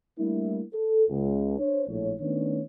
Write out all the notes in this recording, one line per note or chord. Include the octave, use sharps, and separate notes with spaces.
G3 A3 A#3 D4 E4
A4
C#2
D4 C5 C#5
A#1 A2 C#5
D#3 A3 B3 C#4 D4 C#5